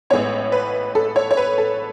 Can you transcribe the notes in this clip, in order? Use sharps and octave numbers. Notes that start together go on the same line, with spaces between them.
A1 A2 G#3 B3 C#5
B4
A4
C#5
C#5
B4
A4